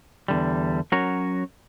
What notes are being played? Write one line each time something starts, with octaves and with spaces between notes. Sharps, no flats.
E2 D3 G3
F#3 C#4 F#4 A#4 C#5